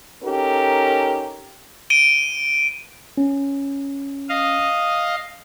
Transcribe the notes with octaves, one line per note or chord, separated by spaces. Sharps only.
C#4 D#4 G4 A4 A#4
D7 D#7 G7
C#4
D#5 F5